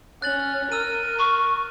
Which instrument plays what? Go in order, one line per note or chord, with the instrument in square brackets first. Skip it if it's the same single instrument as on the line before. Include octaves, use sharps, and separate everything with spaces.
[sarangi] C#4 [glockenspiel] F#6 A6 F#7
[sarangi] A#4 [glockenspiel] E6 F6 D#7
[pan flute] C#6